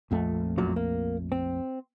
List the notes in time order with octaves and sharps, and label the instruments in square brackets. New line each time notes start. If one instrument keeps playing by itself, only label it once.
[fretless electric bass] A#1 F2 A3
[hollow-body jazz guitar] F#2 A#2 F#3
A#3
C4